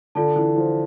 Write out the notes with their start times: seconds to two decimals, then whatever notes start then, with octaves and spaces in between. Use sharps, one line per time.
0.15 D3 F4 A4 D5 A5
0.36 E3
0.56 F3